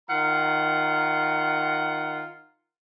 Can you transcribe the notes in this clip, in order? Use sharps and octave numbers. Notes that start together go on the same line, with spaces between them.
D#3 F4 F#5 A#5